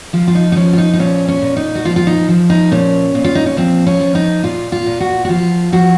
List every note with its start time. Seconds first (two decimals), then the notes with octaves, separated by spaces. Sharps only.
0.13 F3 F4
0.28 F4
0.35 D#4
0.52 D#4
0.56 F3 C#4
0.73 F4
0.78 D#4
0.94 D#4
0.99 A#2 C#4
1.28 C#4
1.42 A#2
1.57 D#4
1.75 F#4
1.85 F3 F4
1.96 F4
2.07 D#4
2.29 F3
2.50 D#4
2.71 A#2 C#4
3.15 A#2
3.24 F4
3.35 D#4
3.46 C#4
3.57 F3 C4
3.87 C#4
4.00 F3
4.15 D#4
4.43 A#2 F4
4.72 F4
4.86 A#2
5.00 F#4
5.25 F#4
5.29 F3 F4
5.72 F3 F#4